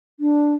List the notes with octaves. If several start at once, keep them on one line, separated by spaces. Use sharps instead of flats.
D4